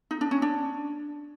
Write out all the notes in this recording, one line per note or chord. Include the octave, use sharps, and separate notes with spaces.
D#4
D4
C#4
D4